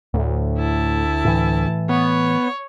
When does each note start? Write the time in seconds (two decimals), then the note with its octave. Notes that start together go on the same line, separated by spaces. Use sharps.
0.14 D2 A2
0.58 E4 A5
1.25 A2 E3
1.89 B3 C#5